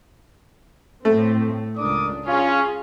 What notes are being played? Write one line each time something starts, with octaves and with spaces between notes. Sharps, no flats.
A2 A3 C4
C#2 D4 A#4 D6 D#6
C#4 F4 G#4